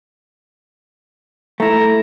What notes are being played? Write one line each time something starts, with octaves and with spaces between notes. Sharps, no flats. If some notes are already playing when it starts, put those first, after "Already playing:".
A3 E4 A#5